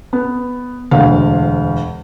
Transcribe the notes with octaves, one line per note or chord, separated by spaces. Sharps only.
B3
E1 D2 F5